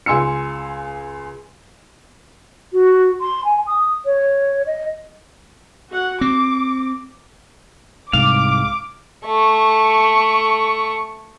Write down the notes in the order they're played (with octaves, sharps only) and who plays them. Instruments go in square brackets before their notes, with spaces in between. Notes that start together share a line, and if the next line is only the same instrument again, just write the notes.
[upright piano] C#2 G#5 C6 E6 C#7
[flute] F#4
C6
G#5
D#6
C#5
D#5
[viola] F#4 F#5
[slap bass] C4 [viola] D6
[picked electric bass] C2 G#2 [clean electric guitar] F5 [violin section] D6
[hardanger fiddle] A3 C#6